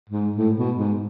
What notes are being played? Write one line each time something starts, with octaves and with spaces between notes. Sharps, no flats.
G#2
A2
B2
G#2